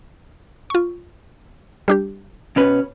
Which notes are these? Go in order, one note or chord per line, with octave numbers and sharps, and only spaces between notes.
F4 C#6
G3 D4 G4
B2 C#4 B4